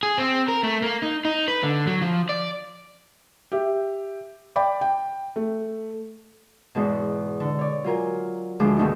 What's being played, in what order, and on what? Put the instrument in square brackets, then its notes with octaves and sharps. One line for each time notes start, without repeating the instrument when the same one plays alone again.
[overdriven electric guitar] G#4
C4
A#4
A3
A#3
D#4
D#4
B4
D3
F#3
F3
D5
[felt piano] G4 E5
D5 G5 B5 D6
G5
A3
[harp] E2 G#2 B2
D3
C#5 D5
F#3 F4 A#4 G#5
D2 F3 G#3 G#4 D6
G#2 B2 D#3 A3 D4 D#4